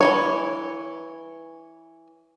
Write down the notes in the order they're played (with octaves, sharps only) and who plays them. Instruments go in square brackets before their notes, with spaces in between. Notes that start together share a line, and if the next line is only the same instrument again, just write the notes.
[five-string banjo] E3 F#3 C#5